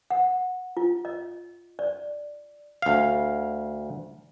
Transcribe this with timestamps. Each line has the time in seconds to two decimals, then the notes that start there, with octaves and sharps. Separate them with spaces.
0.10 F#5
0.77 F4
1.05 D#5
1.79 D5
2.82 D2 F5